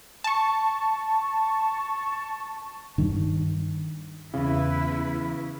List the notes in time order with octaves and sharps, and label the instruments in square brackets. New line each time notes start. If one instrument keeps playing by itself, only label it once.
[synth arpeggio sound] A5 C#6
[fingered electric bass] G2 D#3
[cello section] E2 E4 B4 [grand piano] C#3